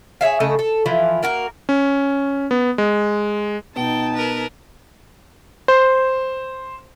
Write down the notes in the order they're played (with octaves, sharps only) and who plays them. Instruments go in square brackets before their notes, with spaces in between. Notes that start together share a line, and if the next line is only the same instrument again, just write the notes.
[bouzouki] G#4 C#5 E5 F5
C#3 A3 A4 D#5
A4
E3 F3 E4 F4
A#3 F#4 A#4
[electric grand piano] C#4
B3
G#3
[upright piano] B2 [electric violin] D#4 A5 [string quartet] G5
[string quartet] A#4 B4
[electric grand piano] C5